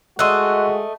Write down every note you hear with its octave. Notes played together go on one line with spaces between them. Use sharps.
G#3 A3 F#4 D#5 C6 E6 F#6